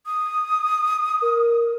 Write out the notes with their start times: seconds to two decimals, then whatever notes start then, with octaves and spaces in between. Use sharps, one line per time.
0.06 D#6
1.22 A#4